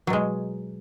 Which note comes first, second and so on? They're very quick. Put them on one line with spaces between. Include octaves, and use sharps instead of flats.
F#3 B2 G#3